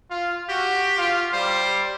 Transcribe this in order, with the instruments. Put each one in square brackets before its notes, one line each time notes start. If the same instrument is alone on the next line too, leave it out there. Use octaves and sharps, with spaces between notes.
[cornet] F4
[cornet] F#4 [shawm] G4
[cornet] F4
[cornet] G3 [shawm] C5